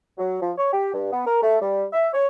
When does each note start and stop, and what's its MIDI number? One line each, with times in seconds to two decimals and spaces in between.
0.18 0.40 54
0.41 0.51 53
0.57 0.71 73
0.72 0.90 67
0.93 1.09 43
1.11 1.22 59
1.26 1.41 70
1.42 1.57 57
1.61 1.84 55
1.93 2.07 76
2.13 2.26 73